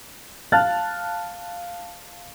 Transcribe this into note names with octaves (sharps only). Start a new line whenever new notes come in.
F5 A5 F6 F#6 A6